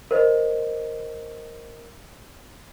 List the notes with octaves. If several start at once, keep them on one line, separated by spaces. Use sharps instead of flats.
A#4 C5 D#5